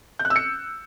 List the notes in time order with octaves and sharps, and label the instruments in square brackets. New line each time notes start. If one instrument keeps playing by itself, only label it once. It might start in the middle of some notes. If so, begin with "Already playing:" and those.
[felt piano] G6
F#6
E6
C#7